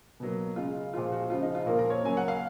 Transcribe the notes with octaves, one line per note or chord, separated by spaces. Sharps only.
B2 F#3 A#3
C#3 G#3 F4
A#2 F3 G#3 F4
F#4
C#3 F3 G#3 F4
D#4
F4
A#2 F3 A#3 A#4
A#4
C#5
C#3 F#3 A#3 G#5
F#5
F5